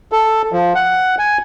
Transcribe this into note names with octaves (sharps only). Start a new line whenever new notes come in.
A4
F3
F#5
G#5